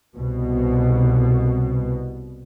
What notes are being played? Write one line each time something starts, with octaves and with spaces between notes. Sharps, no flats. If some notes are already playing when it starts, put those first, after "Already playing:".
C2 B2